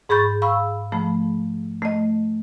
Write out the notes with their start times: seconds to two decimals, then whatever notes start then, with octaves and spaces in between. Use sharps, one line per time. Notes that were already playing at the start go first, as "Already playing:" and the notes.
0.09 G#2 G#4 B5 C#6 G6 A6
0.42 F5 B5 C#6 E6
0.92 F3 A3 B5
1.82 A3 D#5